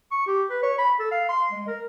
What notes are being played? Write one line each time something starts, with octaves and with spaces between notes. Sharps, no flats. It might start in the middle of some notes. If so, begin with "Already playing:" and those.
C#6
G4
B4
C#5
B5
A4
F5
C6
G#3
A#4